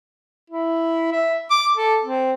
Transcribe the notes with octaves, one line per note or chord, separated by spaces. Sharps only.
E4
E5
D6
A4
C4